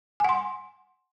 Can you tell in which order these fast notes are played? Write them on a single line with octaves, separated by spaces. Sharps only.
G#5 F#5 C6